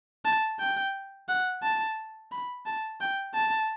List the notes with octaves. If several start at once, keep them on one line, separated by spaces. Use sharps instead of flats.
A5
G5
F#5
A5
B5
A5
G5
A5